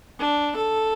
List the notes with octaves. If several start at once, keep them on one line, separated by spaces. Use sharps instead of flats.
D4
A4